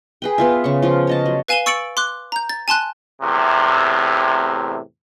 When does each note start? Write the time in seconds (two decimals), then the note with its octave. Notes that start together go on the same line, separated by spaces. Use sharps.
0.22 G#4 B4 G5
0.38 B3 F4 E5
0.64 C#3 C#6
0.82 F3 F4
1.07 C#5 D#5 A5
1.26 F#3
1.48 B4 F5 G#5 D#7 E7 G7
1.66 C#6 E6 A6 C#7 D7 F#7
1.97 C6 D6 F#6
2.32 A#5 G6
2.50 A6
2.68 G#5 A5 C6 F#6
3.22 E2 A2 C3